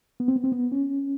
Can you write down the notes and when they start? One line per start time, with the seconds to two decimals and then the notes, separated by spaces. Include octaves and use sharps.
0.20 B3
0.28 C4
0.36 B3
0.44 C4
0.52 B3
0.72 C#4